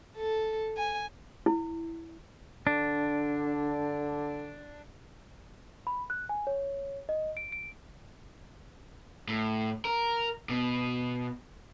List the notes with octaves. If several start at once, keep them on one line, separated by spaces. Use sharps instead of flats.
A4
G#5
E4
D3 D4
B5
F#6
G#5
C#5
D#5
D7
D7
A2
A#4
B2